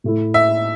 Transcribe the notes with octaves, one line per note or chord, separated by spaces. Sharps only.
A2 A3 E4
E5